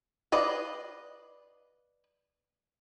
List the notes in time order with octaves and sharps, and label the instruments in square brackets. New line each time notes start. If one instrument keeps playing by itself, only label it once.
[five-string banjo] B4 D5 D#5 F5